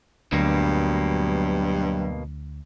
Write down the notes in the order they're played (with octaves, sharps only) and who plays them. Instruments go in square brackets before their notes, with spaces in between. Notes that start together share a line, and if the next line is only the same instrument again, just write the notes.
[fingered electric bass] D2 [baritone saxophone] G2 [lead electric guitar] B2 A#3 [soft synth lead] F#3